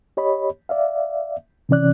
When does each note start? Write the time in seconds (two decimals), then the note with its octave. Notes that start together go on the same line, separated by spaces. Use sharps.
0.17 G4 C#5 D#5 B5
0.69 D5 E5 F5
1.69 C3 E3 C#4 D5 F#6